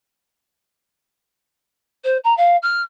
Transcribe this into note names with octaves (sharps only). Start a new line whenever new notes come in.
C5
A#5
F5
F6